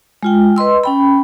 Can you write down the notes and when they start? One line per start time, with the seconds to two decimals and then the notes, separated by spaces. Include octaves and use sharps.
0.23 G#3 F4 G5
0.56 B4 D#5 C6 E6
0.84 C#4 G5 B5